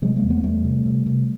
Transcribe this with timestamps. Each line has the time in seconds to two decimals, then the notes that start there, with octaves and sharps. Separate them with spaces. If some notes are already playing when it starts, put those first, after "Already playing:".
0.02 C3 F#3 G#3
0.16 G#3 A#3
0.23 E2
0.30 A3 B3
0.43 E2 G3 A3
0.64 C3
0.86 C3
1.06 C3